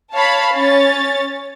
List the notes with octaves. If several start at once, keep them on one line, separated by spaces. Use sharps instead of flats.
C#5 F5 A5 B5
C#4 C#5 A6